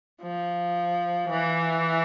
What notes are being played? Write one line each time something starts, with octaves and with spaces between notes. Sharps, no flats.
F3
E3